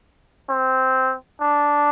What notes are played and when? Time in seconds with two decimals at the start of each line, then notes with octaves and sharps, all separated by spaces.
0.49 C4
1.41 D4